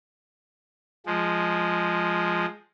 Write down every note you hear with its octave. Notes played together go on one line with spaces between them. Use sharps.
F3 G#3